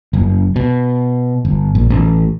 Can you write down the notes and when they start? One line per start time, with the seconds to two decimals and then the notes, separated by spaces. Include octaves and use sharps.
0.13 F#1
0.56 B2
1.45 G1
1.75 A#1
1.90 A1